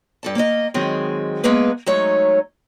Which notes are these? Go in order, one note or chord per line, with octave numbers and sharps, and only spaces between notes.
G2 A4 A5
A#3 A#4 C#5 D#5
D#3 F#3 G#3 C4 G#4
G#3 A#3 B3 G#4 B4
F#3 G#3 A3 D#4 C#5